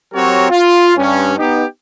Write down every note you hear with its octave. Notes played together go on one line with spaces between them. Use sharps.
F#3 C4 F#4 G4 A#4 C#5
F4
G2 C#4
B3 D#4 G4